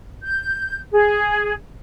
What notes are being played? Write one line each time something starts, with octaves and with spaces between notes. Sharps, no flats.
G6
G#4